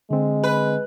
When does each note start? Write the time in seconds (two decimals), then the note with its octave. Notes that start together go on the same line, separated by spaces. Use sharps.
0.11 D3 G#3 C4
0.43 B4